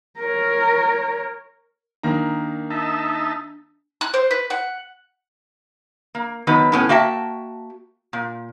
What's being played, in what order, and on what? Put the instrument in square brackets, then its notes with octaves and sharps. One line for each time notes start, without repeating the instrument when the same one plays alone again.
[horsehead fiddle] A#4 C#5
[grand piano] D#3 A#3 A#5 [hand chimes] D4
[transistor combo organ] D#4 E5 A5
[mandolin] F#6
C5
B4
F#5
[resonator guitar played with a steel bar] A#3
D#3 F#3 B3 B4
A2 B3 C#4
A#3 F#4 E5 G5 A5
A#2